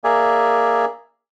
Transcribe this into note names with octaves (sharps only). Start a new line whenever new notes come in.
A#3 G#4 A#4 D5 E5 G#5